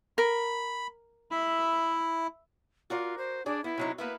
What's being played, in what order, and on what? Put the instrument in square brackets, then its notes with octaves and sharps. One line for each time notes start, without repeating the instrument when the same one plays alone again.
[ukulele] A#4 [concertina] B5
[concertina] E4 [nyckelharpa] E5 B5
[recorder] F4 [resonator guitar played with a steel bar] F#4 A#4 D5
[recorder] C5
[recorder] D4 [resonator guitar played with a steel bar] G#4 D5
[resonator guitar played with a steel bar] B3 [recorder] E4
[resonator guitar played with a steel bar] C3 F#3 D#4
[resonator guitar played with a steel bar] A#3 B3 E4 [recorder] B4